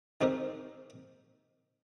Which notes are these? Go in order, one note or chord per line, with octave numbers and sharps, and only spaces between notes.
D#3 G#3 C4 G4 A#4